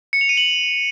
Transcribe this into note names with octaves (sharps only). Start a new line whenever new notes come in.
C#7
F7
D#7
F#7